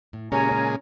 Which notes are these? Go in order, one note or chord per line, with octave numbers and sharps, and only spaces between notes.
A2
A#2 C#3 G#3 C#4 G4 C#5 G#5 A#5
C#4